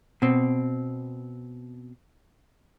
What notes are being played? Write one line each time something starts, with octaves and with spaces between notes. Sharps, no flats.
B2 C4